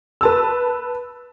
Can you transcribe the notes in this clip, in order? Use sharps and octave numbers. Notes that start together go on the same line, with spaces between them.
B4 A5 E6